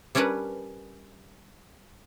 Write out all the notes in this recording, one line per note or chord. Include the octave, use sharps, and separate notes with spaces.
G3 C#4 D4 A#4 B4